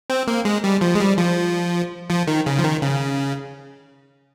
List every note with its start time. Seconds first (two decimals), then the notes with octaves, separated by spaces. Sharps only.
0.10 C4
0.27 A#3
0.45 G#3
0.64 G3
0.81 F3
0.95 G#3
1.00 G3
1.18 F3
2.10 F3
2.27 D#3
2.46 C#3
2.58 F3
2.64 D#3
2.82 C#3